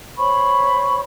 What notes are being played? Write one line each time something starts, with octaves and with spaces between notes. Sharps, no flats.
C5 C#5 B5 C#6